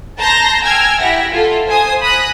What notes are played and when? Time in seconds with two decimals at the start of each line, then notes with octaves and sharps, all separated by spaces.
0.18 A5 A#5 C6 G6 A#6
0.64 G5 G#5 E6 F6 G#6
1.00 E4 G4 E5 F#5 A#6
1.32 F4 A4
1.67 C5 G#5 D#6
2.02 B5 D#6 F#6 A#6